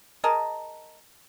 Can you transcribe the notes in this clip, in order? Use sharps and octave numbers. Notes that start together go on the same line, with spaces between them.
G#4 A#4 D#5 A5